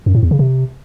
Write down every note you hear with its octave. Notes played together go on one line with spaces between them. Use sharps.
F#2
A2
E2
C#3
C3